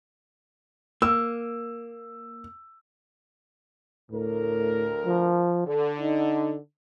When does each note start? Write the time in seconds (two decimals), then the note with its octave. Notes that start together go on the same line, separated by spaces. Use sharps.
1.02 A#3 E6
4.11 D2 A2 A#4
5.06 F3
5.67 D3 A4
6.00 D#4